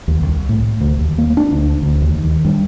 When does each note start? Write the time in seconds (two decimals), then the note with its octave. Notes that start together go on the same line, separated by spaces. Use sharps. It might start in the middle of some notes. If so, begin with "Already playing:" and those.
0.08 D#2
0.23 C2
0.49 A2
0.80 D2
0.99 D#2
1.18 A#3
1.37 D4
1.51 D2
1.82 D2
2.02 D#2
2.24 D#3
2.45 G2